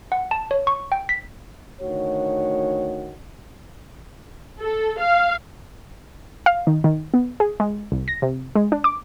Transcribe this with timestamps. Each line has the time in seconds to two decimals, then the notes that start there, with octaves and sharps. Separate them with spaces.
0.12 F#5
0.31 A5
0.51 C#5
0.67 C#6
0.92 G5
1.09 B6
1.82 D2 D#3 A3 F#4 C#5
4.61 A4
4.99 F5
6.46 F5
6.67 D#3
6.84 D#3
7.14 B3
7.40 G#4
7.60 G#3
7.92 C2
8.08 A#6
8.22 C3
8.55 G#3
8.72 D4
8.84 D6